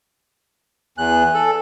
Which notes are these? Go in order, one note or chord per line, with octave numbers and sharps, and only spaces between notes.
E2 G#5 F#6
A4